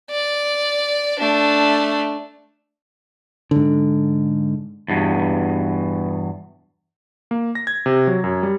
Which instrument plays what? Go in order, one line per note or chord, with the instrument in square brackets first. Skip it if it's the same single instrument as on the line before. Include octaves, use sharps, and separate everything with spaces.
[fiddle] D5
A3 D4
[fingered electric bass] G#2 D3
[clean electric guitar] E2 G2 B2
[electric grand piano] A#3
A#6
G#6
C3
F#3
F#2
G3